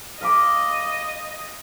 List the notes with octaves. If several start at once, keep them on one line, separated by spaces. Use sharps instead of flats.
D#5 F5 B5 D6